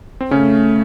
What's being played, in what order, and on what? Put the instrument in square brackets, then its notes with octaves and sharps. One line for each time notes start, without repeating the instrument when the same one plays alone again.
[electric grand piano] C4
[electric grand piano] C#3 C#4 [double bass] A3